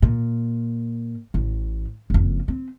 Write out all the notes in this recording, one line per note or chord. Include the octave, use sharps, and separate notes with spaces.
A#2
A1 A2
F#1 F2
C4